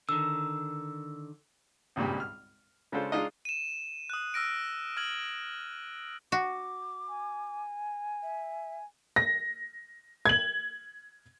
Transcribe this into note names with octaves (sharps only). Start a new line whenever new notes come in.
D3 D#3 E6
G#1 C#2 G2 A#2 G3
F6
C#3 G#3 D4 F4 A4 C5
G#3 D4 D#4 F4 D#5
D#7 E7
D#6 F#6
E6 F6 A#6 D7
F6 G#6 F#7
F#4 D6
G#5
E5
A#6
G#6 F#7